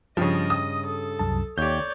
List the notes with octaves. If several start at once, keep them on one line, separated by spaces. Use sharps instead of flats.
G2 C#3 F3 D#5
D#6
A4
C2 F#2 A5
D#2 G4 C#5 D5 G6